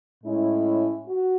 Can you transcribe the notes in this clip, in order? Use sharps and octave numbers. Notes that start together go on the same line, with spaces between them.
A2 G#3 C#4 E4
F#4